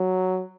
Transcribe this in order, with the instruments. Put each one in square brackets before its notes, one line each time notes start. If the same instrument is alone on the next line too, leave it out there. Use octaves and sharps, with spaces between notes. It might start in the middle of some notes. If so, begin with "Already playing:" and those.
Already playing: [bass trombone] F#3